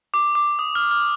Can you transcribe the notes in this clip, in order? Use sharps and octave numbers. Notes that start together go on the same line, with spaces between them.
D6
D6
D#6
F6
F6